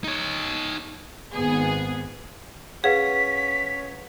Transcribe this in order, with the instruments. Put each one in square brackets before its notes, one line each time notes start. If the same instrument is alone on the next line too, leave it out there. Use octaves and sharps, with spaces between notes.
[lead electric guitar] D#4 C#5
[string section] G#1 B3 G#4
[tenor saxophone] C#4 [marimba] G#4 [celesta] B4 F5 F#5 [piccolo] B6